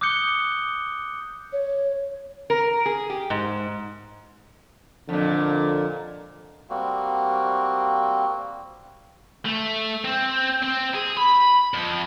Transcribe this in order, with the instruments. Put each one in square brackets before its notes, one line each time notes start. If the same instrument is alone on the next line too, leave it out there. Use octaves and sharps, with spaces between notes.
[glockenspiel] D6 D#6 F#6 G6 C#7 G7
[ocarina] C#5
[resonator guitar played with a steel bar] A#4
G#4
G4
G#2
[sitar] F2 A#2 [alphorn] D3
[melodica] G3 A#3 C4 F#4
[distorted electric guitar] A3
C4
C4
G#4
B5
F2